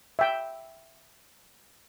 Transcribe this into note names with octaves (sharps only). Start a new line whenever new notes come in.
E5 G5